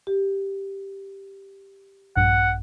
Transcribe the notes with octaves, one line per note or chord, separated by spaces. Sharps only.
G4
A#1 G2 F#5